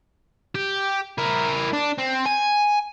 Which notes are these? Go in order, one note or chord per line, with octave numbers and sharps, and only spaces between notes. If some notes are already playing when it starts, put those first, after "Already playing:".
G4
E4 A#4
D4
C4
G#5